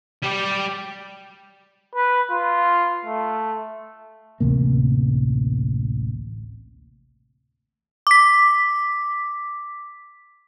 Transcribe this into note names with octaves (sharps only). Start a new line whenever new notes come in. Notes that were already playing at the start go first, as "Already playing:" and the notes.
G3 G4
B4
F4
A3
A1 D2 C3 A#3
D6 B6